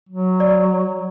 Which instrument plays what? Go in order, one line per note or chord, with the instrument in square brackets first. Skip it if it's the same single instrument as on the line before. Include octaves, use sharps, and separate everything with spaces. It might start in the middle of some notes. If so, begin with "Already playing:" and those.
[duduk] F#3
[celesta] D5